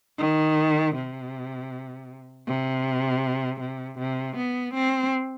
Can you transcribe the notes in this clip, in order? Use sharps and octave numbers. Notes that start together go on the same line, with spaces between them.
D#3
C3
C3
C3
C3
B3
C4